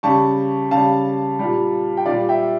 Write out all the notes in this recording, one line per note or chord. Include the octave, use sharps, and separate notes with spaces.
C#3 G3 A5 C#6
C#3 G3 F5 A5
A#2 G3
G5
A#2 G3 D5 F5
E5 G5